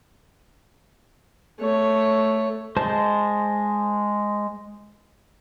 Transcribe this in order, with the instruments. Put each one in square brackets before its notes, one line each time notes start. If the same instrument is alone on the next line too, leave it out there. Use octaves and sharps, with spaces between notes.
[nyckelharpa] A3 C#5
[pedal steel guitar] G#3 C5 A5